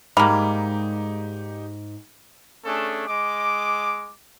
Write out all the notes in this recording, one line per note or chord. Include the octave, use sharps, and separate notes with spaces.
G#2 G3 A#3 D#4 G4 B5
A3 C#4 D4 G#4 A4
G#3 D#5 D6